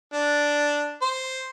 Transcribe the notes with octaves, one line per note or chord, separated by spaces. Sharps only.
D4
C5